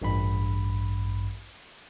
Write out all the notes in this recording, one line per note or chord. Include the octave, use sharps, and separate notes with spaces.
A1 G2 B5